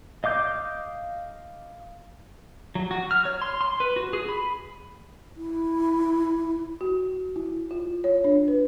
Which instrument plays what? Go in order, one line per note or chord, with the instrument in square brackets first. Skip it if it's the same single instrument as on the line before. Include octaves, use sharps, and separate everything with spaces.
[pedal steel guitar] D#5 F5 D6 G6
F#3
F#4
F6
C#5
C6
C6
B4
F#4
G#4
B5
[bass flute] E4
[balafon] F#4
E4
F4
C#5
D4
B4